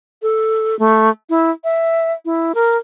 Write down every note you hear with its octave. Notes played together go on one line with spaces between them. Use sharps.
A4
A3
E4
E5
E4
A#4